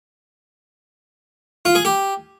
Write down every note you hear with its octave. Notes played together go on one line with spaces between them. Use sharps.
F4
G#4
G4